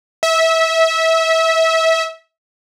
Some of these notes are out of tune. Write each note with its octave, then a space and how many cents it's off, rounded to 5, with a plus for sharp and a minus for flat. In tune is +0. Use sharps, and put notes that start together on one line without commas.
E5 -25